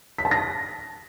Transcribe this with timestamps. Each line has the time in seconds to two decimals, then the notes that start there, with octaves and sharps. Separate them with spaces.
0.18 B6
0.25 A5
0.31 A#6